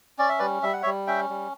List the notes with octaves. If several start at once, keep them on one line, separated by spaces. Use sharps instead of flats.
C#4 D5
E5
G3 B4 D5
G3 E5
F#5
C#5 E5
G3
C#4 E5 G5
G3